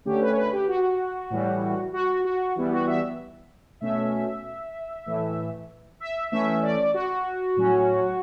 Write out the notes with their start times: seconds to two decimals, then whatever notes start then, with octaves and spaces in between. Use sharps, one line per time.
0.05 D3 A3 C#4 G4
0.21 B4
0.31 C#5
0.37 B4
0.52 G4
0.68 F#4
1.30 A2 E3 G3
1.93 F#4
2.25 F#4
2.55 E3 G3 B3
2.72 F#4
2.87 E5
3.81 B2 A3 C#4 E5
5.06 A2 E3 A3
6.00 E5
6.31 E3 A3 C#4 E5
6.63 D5
6.94 F#4
7.56 A2 F#3 C#4